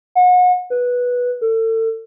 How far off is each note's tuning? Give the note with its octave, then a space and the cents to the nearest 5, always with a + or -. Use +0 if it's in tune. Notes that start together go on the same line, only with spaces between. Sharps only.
F#5 -35
B4 -10
A4 +35